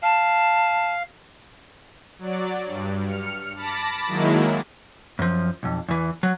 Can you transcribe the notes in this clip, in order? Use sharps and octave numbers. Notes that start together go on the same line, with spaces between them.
F5 A5
F#3 D5
G2
F6 C#7
A5 B5 D6 A6 A#6
D#3 F#3 G#3 A#3 E4
F#2 F3
B1 F2
E2 E3
F#3